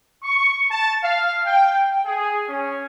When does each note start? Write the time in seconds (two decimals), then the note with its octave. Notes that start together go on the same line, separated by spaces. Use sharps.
0.23 C#6
0.70 A5
1.02 F5
1.46 G5
2.05 G#4
2.48 C#4